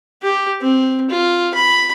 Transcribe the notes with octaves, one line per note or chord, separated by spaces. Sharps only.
G4
C4
F4
B5